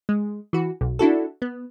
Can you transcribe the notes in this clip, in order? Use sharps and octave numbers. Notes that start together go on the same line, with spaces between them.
G#3
E3 F#4
B1
D4 E4 F#4 A4
B3